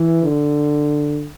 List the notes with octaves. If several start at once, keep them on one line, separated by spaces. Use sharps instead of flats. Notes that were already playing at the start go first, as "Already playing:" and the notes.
Already playing: E3
D3